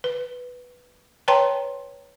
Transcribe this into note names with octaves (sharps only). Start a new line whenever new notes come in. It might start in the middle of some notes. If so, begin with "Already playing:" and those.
B4
B4 C#5 G5 A5 A#5 C6